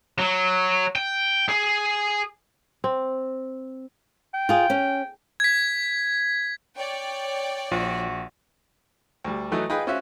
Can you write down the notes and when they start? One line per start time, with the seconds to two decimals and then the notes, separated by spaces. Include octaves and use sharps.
0.19 F#3
0.96 G5
1.49 G#4
2.84 C4
4.34 G5
4.49 F4 G#4
4.70 C#4
5.40 G#6 B6
6.77 C#5 D5 G5
7.71 A#1 F3 F#4
9.24 D2 G3
9.51 E3 F#3 A3 D#4
9.70 D#4 F4 G#4 B4 G5 B5
9.87 C#4 F4 F#4 C5 E5